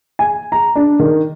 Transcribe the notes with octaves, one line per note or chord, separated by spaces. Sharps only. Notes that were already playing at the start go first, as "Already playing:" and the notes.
G#5
A#5
D4
D#3